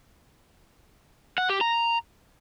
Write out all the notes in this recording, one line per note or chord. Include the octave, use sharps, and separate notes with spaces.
F#5
G4
A#5